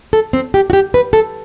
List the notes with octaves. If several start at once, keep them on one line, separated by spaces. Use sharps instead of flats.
A4
C4
G4
F#4
G4
B4
A4